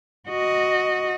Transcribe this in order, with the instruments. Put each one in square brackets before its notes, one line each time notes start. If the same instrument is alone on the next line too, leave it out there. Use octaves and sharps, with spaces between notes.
[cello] F#4 D#5